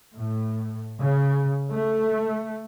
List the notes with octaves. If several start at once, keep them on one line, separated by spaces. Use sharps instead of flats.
A2
C#3
A3